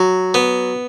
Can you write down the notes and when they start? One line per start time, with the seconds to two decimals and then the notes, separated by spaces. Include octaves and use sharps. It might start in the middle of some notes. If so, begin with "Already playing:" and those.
Already playing: F#3
0.34 B3